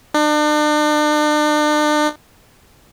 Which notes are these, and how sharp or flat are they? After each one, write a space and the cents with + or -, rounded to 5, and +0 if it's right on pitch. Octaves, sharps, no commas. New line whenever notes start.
D4 +40